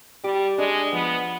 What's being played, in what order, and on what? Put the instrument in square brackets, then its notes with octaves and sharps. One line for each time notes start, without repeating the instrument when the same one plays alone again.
[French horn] G3 [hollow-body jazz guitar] G4
[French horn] G#3 [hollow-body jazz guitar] D4
[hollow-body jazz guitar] F3 [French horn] B3